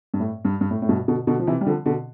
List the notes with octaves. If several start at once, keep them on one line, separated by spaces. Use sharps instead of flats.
G2
A2
G2
G2
A2
A2
G2 B2
B2 D3
B2 D3
F3
C3 E3
G3
D3 F3
B2 D3